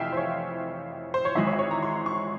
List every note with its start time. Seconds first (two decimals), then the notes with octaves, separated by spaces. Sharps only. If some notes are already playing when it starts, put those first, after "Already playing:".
Already playing: F1 F2 E3 E5 F5 G5 G#5
0.12 C5
0.17 C#5
1.14 C5
1.25 C#5
1.35 G#1 G#2 E3 G#3 E5
1.47 C#5
1.53 E5
1.59 C#5
1.71 A#5
1.82 C6
2.06 C#6